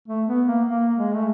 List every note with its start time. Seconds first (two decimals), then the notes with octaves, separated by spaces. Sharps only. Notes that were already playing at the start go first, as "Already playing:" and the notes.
0.08 A3
0.27 B3
0.47 A#3
0.67 A#3
0.96 G#3
1.15 A3